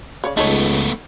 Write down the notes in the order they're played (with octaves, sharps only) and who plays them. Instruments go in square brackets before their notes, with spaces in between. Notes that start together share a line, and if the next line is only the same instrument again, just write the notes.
[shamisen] C#3 C#5 D5
[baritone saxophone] C#2 [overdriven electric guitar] A3 B3 [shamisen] D#4 A4 C#5